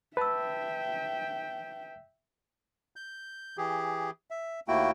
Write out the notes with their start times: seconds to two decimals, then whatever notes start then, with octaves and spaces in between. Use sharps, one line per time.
0.17 B4 C5 E5 G5 A5 E6
2.96 G6
3.57 E3 G4 G#4
4.31 E5
4.68 D#2 A3 A#3 E4 F#4 G5